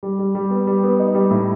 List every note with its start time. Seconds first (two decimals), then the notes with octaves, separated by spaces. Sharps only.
0.03 G3
0.19 G3
0.35 G3
0.50 B3
0.67 G3
0.83 B3
0.99 D#4
1.15 G3
1.31 A2